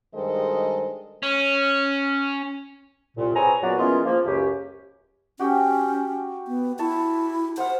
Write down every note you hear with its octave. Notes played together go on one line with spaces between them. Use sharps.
G2 D#3 G#3 A4 C5 D#5
C#4
C2 A#2
C4 G#4 B4 C#5 G#5 A#5
A#2 F#3 B3 F#4 D5
E3 G#3 A#3 B3 C#4 F4
F3 A#3
C#2 F#2 C#4 G4
C#4 F#4 G4 G5
B3
E4 A5 C#6
C5 F5 F#5